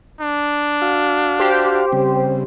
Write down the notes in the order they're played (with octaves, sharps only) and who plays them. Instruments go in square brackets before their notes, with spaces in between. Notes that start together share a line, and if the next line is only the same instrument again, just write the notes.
[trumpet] D4
[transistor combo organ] F#4 F5
[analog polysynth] G4 C5
[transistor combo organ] C#3 G3 C4